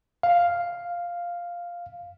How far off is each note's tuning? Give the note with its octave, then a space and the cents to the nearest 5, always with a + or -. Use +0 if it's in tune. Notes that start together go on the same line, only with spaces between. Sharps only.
F5 +0